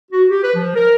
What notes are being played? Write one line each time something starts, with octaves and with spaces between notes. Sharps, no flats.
F#4
G4
B4
F3
A#4